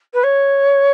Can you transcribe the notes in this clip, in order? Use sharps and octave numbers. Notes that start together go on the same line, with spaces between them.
B4
C#5